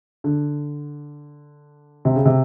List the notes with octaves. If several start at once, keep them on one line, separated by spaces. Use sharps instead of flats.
D3
C3
C#3
C3